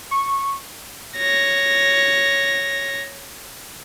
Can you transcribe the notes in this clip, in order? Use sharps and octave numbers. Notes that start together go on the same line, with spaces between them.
C#6
C#5 A#6